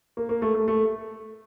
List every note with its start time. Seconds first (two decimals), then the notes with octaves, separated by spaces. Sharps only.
0.17 A#3
0.29 A#3
0.42 A3
0.55 A3
0.68 A3